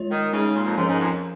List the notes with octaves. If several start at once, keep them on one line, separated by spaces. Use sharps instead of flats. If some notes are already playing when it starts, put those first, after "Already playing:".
Already playing: G#3 F4 C#5
D#3
C#3 G#3 D#4 C#5
A#2
F2
G#2 F3 C#4 A#4 C#5
G#2
F2